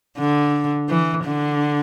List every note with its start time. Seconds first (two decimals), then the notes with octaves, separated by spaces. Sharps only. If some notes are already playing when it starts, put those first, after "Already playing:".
0.18 D3
0.89 E3
1.25 D3